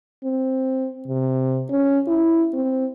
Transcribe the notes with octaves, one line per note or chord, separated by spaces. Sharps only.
C4
C3
C#4
E4
C4